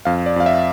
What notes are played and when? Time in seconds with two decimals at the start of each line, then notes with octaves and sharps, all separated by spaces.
0.05 F2 F5
0.26 D5
0.36 F2 F5
0.46 E5